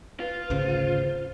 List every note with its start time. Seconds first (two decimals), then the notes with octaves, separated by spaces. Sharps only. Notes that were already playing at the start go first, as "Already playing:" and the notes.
0.20 F4 B4
0.50 G#1 D2 C#3 C5